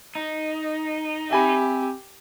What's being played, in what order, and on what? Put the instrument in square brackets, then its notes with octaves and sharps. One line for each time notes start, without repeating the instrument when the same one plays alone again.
[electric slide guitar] D#4
[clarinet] C4 [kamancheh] G4 [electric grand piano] E5 G#5 B5